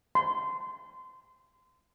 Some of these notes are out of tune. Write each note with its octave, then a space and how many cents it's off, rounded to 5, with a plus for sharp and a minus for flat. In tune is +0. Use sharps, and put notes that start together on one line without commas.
C6 -25